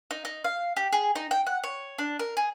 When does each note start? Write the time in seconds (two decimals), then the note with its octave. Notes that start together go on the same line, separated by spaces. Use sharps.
0.11 D#4
0.25 D#4
0.44 F5
0.77 G4
0.93 G#4
1.16 D#4
1.31 G5
1.47 F#5
1.64 C#5
1.98 D4
2.19 A#4
2.37 G#4